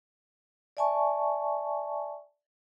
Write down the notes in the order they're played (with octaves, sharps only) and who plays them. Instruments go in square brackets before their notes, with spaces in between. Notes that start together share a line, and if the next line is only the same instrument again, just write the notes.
[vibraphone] D5 E5 G#5 A5 C#6